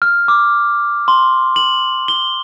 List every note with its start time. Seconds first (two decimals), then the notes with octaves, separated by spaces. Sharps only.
0.02 F6
0.28 D6
1.08 C6
1.56 F#7
2.08 G7